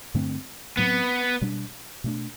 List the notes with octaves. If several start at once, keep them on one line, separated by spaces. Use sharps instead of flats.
G2 D3 A3 C4
A2 F#3 B3 C4
B2 G3 D4
B2 A3 D4